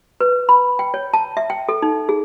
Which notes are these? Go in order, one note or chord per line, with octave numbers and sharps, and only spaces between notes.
B4
B5
G5
C#5
A5
E5
G5
A4
D#4
G#4